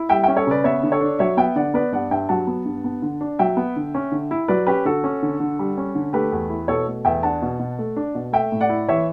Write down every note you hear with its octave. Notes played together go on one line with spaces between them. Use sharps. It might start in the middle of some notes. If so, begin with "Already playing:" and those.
Already playing: E4
G3 E5 G5
C#4 E5 G5
A4 C#5
C#3 B4 D5
B3 C#5 E5
D3
A4 C#5
D4
F#3 C#5 E5
B3 E5 G5
D3 D5 F#5
B3 B4 D5
G2 D5 F#5
G2 E5 G5
F#3 F#5 A5
B3
G2
B3
D3
D4
F#3 E5 G5
B3
D3
C#4
D3
E4
F#3 B4 D5
C#4 G4 B4
D3 F#4 A4
C#4
D3
D3
G3
C#4
D3
A3 G4 B4
E2
E4
B2 A4 C#5
A3
E2 E5 G5
D4 F#5 A5
B2
B2
A3
D4
B2
A3 E5 G5
A2
D5 F#5
E4
E3 C#5 E5